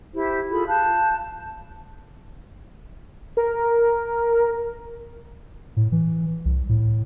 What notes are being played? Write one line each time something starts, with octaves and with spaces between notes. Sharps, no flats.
E4 G4 C5
F4 G#4 A4 B5
F5 A5 F#6 G6
A#4
A2
E3
C2
A2